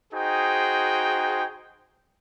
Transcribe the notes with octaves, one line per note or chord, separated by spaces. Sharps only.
D#4 F#4 G#4 C5 G5